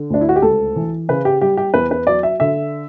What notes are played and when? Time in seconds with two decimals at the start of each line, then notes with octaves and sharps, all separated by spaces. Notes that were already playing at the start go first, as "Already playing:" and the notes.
Already playing: D3
0.10 D2 D4
0.21 E4
0.29 F#4
0.36 G4
0.42 C#2 A4
0.76 E3
1.09 C#3 B4
1.25 G4
1.41 G3 G4
1.57 G4
1.74 E2 B4
1.91 B4
2.07 F#3 D5
2.23 E5
2.40 D3 E5